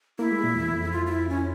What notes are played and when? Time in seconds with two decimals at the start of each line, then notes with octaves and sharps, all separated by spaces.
0.19 A#3 E4
0.31 G#3
0.43 A#2
0.55 E2
0.74 F2
0.92 F4
1.06 F4
1.11 E4
1.29 C#4